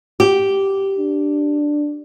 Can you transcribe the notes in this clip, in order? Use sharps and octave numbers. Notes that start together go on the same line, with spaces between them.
G4
D4